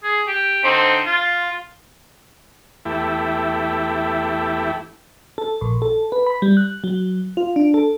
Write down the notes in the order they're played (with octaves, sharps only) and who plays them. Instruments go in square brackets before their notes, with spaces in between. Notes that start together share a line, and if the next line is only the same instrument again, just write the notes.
[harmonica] G#4
G4
D3 C4 D#4
F4
[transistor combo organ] E2 A3 E4 G4
[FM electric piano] A4
A#1
A4
B4
B5
G3
F#6
F#3
F4
D4
A4